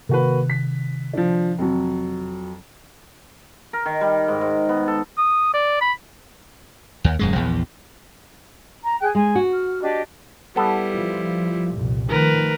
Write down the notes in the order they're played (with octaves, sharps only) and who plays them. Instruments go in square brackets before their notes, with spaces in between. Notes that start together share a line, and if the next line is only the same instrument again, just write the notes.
[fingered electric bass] C3 D#3 [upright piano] A#3 F#4 B4
[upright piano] B6
F3 D4
F2 F#3
[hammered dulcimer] A#4
D#3
G3
G#2
G#2
B3
A4
[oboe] D#6
D5
B5
[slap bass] D#2
D#1 F#2 G#3
A#1 E2
[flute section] A#5
G#4 G5 F#6
[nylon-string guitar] G#3 [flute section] G#5
[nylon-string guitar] F#4
[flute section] F6
D4 G4 D#5
[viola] G3 E4 [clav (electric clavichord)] B3 A4
[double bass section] F3
C2 F2 A#2
[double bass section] D#3 F3 A3 [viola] A#4 B4